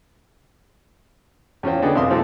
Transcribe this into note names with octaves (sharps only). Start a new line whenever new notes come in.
E2 C#4 F4 C5 G5
D3 B3 G#4 D5 D#5 G5
B1 F2 E5 F5 C6 D#6
F3 G#3 C4 D#4 G4 A4